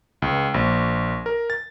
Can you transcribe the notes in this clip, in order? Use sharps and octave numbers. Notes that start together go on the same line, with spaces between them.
C#2
A#1
A#4
A6